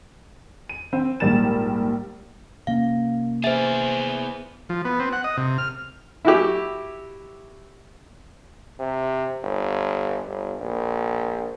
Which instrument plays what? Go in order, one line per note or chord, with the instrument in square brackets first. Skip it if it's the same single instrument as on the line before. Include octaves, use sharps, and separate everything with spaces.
[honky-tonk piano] D#7
C4
A#1 G#2 G3 A#4 A6 E7
[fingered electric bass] C3 A#3 C#4 [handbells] F5
[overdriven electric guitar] B3 G#4 [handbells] C5 E5
[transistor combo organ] F3
B3
C4
F#5
D#5
C3
F6
[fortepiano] E4 F#4 G4
[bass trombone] C3
G1
G1
A#1